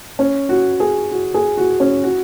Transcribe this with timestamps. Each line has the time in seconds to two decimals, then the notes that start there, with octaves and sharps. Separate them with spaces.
0.19 C#4
0.49 F#4
0.80 G#4
1.12 F#4
1.34 G#4
1.57 F#4
1.80 C#4
2.03 F#4